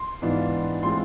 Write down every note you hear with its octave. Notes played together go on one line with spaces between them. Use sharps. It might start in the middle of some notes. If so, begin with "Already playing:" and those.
Already playing: C6
G#2 E3 B3 D4 F4
E3 G#3 C4 F4 C6